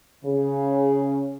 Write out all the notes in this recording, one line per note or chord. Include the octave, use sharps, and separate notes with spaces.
C#3